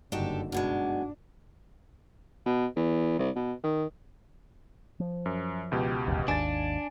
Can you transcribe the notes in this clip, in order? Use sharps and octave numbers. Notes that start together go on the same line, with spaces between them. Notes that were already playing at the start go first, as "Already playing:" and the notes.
F#1 G2 D3 D4 D#4 F#4 G4 A4
F#2 B2 G#3 D4
B2
E2
C2
B2
D#3
F3
F#2
C#2 B2 G4
E1 A1 D#2
G#1 D#2 D4 G#5 A6